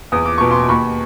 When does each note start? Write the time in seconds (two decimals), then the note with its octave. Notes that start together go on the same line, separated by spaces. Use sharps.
0.12 E2 D#6
0.25 D6
0.38 B2 C#6
0.51 C6 D6
0.69 D#2 B5 C#6